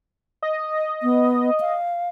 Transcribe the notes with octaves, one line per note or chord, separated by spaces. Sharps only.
D#5
B3
F5